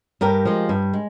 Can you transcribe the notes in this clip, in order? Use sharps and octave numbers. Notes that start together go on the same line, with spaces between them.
G2 G4 A#4
F3 G#3
G2
G#3